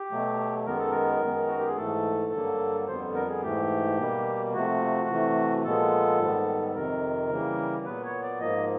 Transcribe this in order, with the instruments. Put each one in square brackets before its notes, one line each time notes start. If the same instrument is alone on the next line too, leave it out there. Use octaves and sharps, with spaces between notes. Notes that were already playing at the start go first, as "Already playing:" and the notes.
Already playing: [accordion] G4
B2 F#3 A3
F#2 D#3 G#3 B3 A#4
A4
A#4
F#2 D#3 G#3 B3
F#4
G4
G#4
G#2 E3 A3 A4
G2 D3 F#3 A#3
F2 D3 G3 B3 C5
A#4
G#4
G#2 E3 A3 G4
B2 G3 A#3
C3 F3 A3 F#4
C3 E3 A3
A#2 F3 G#3 B3 A4
G#2 D#3 G3 B3
F2 C3 D#3 A#4
C#3 E3 G3 A#3
A#2 F#3 B3 B4
C#5
D5
G#2 F3 A#3 D#5